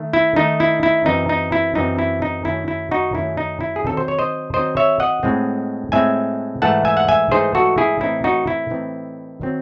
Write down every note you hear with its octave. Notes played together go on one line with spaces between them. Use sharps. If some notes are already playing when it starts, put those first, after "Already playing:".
Already playing: D#3 A3
E4
D#3 A3 D#4
E4
E4
F#2 E3 C4 D#4
D#4
E4
F#2 E3 C4 D#4
E4
D#4
F#2 D#3 A3 C#4 E4
E4
D#4 F#4
F#2 D#3 A3 C#4 E4
D#4
E4
G#4
D#3 F#3 C4 D#4 A4
C5
C#5
C5 D#5
D#3 F#3 C4 D#4 C5 D#5
C#5 E5
D#5 F#5
A2 G#3 C4
A2 G#3 C4 E5 G#5
G#2 E3 A3 D#4 F#5 A5
E5 G#5
F#5
E5 G#5
G#2 E3 A3 D#4 G#4 C5
F#4 A4
E4 G#4
A2 E3 C4 D#4 E4
D#4 F#4
E4
A2 E3 C4 D#4
D#3 F#3 C4